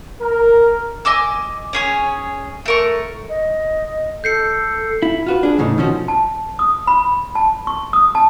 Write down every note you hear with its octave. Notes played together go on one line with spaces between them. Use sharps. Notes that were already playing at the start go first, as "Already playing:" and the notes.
A#4
D#5 G#5 D6 E6
C#4 G#4 C#5
A3 A#4 C#6
D#5
A4 G6 C7 C#7
E4
F4 F#4 B4
D4 G#4
E2 A2 C#3 E3 B3 D#4
B2 D#3 F3 C#4 F#4
A5
D#6
B5
A5
C#6
D#6
A5